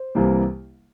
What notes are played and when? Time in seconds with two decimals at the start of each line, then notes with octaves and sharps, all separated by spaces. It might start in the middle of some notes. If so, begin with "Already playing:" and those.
Already playing: C5
0.15 C2 C3 E3 G3 A#3